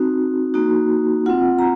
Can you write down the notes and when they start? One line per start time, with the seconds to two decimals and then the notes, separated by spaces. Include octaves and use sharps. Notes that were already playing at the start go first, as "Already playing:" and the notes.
Already playing: C4 D#4 F#4
0.54 A#3 D#4 F#4
1.26 C4 F4 F#5
1.59 A#5